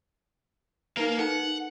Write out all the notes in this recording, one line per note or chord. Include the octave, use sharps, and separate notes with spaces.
A#3 D#4 A#4 B4 F5
D#4 A4 B4 F#5